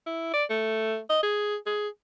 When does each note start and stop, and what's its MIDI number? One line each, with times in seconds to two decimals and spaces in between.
0.06 0.31 64
0.33 0.44 74
0.50 0.99 57
1.09 1.22 75
1.23 1.56 68
1.66 1.88 68